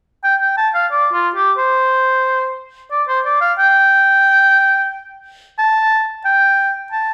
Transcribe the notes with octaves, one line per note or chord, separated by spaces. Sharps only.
G5
G5
A5
F5
D5
F4
G4
C5
D5
C5
D5
F5
G5
A5
G5
A5